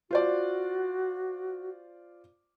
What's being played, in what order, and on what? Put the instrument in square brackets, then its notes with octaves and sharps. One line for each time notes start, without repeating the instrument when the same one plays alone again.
[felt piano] F4 C5 D5 [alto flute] F#4